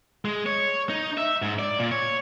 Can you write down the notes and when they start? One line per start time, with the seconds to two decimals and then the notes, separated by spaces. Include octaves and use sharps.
0.25 G#3
0.46 C#5
0.89 D#4
1.18 E5
1.42 G#2
1.59 D5
1.79 A#2
1.91 C#5